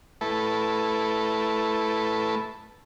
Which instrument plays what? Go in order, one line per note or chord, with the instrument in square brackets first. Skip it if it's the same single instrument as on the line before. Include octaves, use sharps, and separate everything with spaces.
[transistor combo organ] A3 E4 A4 B4